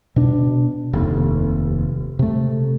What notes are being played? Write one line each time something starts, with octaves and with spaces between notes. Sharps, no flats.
B2 D4
F1 D#2 C3
C3 A3